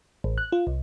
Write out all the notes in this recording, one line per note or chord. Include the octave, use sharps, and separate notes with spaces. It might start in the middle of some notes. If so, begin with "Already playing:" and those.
A1
F#6
F4
C2